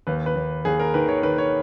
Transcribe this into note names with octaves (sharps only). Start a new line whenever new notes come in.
D#2 B4
B4
D#2
D#2 G#4
A#4
D#3 B4
C#5
D#3 B4
C#5